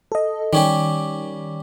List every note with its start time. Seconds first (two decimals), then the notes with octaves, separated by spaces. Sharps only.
0.12 A4 D#5
0.53 D#3 G3 C#4 G4